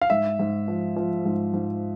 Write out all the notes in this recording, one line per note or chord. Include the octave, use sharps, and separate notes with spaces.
F5
G#2 E5
G#2
F3
F3
G#2
G#2